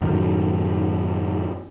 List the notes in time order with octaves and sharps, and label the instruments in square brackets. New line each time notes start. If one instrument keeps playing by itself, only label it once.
[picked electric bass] F#2 A2 D#3 F#3